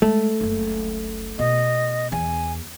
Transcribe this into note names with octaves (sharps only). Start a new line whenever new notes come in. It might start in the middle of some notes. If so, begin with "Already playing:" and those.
G#3 A3
F#1 C#2
B2 D#5
E2 G#5